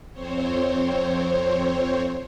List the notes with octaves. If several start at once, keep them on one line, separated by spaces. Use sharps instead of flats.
F2 C4 C5 C#5